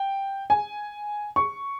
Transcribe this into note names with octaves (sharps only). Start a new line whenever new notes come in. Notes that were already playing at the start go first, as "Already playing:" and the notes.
Already playing: G5
G#5
C#6